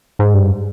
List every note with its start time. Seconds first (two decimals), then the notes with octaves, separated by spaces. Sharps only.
0.19 G#2
0.34 G2